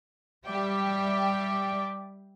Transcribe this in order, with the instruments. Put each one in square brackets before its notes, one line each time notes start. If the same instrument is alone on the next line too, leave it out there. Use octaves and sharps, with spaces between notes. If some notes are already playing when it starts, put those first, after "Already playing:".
[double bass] G3 [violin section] G4 E5 G5 [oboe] D5